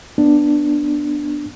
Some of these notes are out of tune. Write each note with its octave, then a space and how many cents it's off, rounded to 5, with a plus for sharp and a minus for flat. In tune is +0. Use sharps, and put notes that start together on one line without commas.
B3 +0 D4 +5